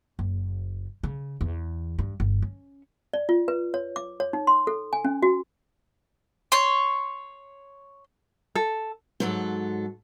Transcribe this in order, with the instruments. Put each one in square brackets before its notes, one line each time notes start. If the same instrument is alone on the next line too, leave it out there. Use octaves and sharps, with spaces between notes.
[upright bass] F#1
C#3
E2
G2
G1
C#4
[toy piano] D5
F4
B4
C#5
D6
C#5
D#4
C6
A4
G#5
C#4
F#4
[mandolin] C#5 C6
[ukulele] A4
[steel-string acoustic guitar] G#2 F#3 A4